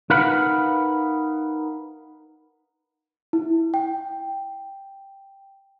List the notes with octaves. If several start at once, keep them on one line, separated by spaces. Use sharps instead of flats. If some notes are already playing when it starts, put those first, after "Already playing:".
D#4 A#4 B4 F5 F#5 B5
E4
G5